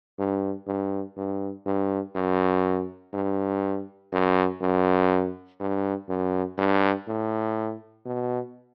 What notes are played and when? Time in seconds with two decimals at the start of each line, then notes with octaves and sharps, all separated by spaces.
0.19 G2
0.67 G2
1.17 G2
1.66 G2
2.15 F#2
3.13 G2
4.12 F#2
4.61 F#2
5.60 G2
6.09 F#2
6.58 G2
7.07 A2
8.05 B2